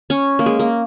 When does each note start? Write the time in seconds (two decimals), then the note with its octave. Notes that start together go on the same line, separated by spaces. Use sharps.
0.10 C#4
0.39 A#3
0.46 G#3
0.59 A#3